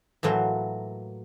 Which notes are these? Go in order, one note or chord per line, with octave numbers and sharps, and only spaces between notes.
A2 E3 F#3 A#3 F4